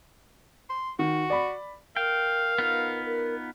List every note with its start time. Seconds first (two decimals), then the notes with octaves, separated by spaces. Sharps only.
0.69 C6
0.99 D#3 F#4
1.30 D5 B5
1.96 A#4 F5 G5
2.58 B3 D#4 F4
3.05 A#4